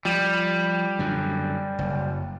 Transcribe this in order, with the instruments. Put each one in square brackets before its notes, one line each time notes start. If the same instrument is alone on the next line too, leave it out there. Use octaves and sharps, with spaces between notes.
[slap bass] F3 [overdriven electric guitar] G3
[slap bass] F#2 D3
F#1